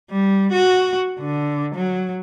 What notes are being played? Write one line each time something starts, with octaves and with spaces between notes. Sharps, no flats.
G3
F#4
D3
F#3